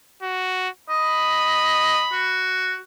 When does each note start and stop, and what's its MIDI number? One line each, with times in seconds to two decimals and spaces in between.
0.22 0.69 66
0.89 2.06 75
0.89 2.52 83
2.12 2.77 66